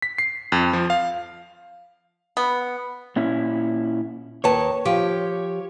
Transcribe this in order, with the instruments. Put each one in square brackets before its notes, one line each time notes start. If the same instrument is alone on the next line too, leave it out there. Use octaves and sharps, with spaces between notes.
[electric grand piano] B6
C7
F2
F3
F5
[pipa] B3
[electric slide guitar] A#2 C#4 E4
[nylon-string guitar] D#2 B4 A5 [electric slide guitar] C#5
[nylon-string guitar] F3 G4